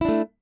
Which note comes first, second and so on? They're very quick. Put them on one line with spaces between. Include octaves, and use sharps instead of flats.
E4 D4 A3